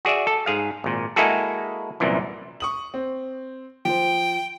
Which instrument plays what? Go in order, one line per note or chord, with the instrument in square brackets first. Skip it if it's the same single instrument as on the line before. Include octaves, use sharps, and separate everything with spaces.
[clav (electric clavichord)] F#4 G#4 D5 E5
A4
G#2 G#4 F5
G#1 A#2
G#3 A#3 E4 F#4 G#4 A4
C2 F#2 A#2 E3
[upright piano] C#6 D#6 F#7
C4
[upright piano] F3 C5 [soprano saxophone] G5